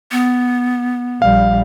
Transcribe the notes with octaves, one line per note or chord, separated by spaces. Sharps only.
B3
A#1 G3 F5